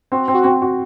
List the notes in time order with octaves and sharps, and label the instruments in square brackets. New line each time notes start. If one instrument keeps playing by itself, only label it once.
[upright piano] C4 [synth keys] F#4
[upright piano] C4
[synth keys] F#4
[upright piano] C4
F#4